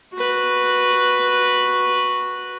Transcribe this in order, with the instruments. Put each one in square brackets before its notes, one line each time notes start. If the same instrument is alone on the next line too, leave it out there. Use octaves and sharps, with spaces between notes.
[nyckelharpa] F#4 B4